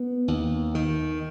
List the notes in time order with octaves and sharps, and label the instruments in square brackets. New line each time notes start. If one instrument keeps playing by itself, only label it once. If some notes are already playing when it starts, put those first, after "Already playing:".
Already playing: [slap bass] B3
D#2
D#3